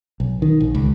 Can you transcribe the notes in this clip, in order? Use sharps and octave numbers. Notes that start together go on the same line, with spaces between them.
B1
D#3
A#1
C#2